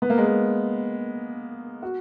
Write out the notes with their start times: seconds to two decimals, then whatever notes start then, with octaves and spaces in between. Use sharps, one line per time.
0.02 B3
0.10 A#3
0.18 G#3
0.26 A#3
1.82 F#4